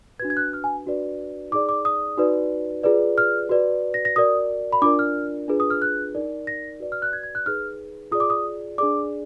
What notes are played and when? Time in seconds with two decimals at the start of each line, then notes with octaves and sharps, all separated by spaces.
0.19 B4 G#6
0.22 D4 F#4
0.30 G#6
0.37 F#6
0.53 F6
0.64 G#5
0.86 D4 F#4 B4 D5
1.51 D#4 G#4 D5 D6
1.69 D6
1.85 D#6
2.17 D#4 F#4 B4 D5
2.83 F4 G#4 B4 D5
3.18 F6
3.49 F#4 B4 D5
3.94 A#6
4.05 A#6
4.16 F#4 A#4 D5 D#6
4.73 B5
4.82 D4 F4 A#4 D5 D6
4.99 F6
5.48 D4 F4 G#4 B4
5.60 D#6
5.70 F6
5.82 F#6
6.15 D#4 A#4 D5
6.47 A#6
6.80 F#4 B4 D5
6.92 F6
7.02 F#6
7.13 G#6
7.23 G#6
7.35 F#6
7.46 D#4 G#4 B4 F6
8.11 F4 G#4 D5 D#6
8.20 D6
8.30 D#6
8.78 D4 G#4 D5 D6